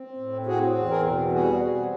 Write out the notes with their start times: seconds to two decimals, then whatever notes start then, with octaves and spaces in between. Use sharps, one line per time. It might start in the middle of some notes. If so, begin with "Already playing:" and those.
Already playing: C4
0.17 A2
0.46 C4 F#4 G#4
0.75 E2
0.89 G#4 A#4
1.04 B2
1.31 G3 F#4 G#4
1.61 C4